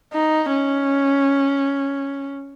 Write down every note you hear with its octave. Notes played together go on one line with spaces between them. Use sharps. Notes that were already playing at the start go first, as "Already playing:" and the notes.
D#4
C#4